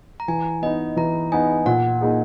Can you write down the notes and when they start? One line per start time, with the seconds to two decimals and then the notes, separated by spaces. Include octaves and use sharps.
0.20 A#5
0.28 E3 G#5
0.62 B3 D#4 D#5
0.96 E3 A#5
1.32 B3 D#4 G#5
1.66 A#2 F#5
2.01 A#3 D#4 G#4